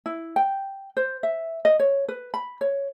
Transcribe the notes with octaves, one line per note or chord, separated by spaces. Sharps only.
E4
G5
C5
E5
D#5
C#5
B4
B5
C#5